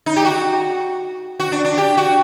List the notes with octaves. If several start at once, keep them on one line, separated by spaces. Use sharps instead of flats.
D#4
G4
F#4
F#4
D4
D4
G4
F#4